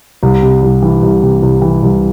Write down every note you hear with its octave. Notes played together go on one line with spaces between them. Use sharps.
C2
C3
C2
E3
C2
C3
C2
E3
C2